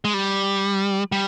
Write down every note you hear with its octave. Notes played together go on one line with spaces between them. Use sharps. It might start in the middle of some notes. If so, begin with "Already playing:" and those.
G#3
G3
G3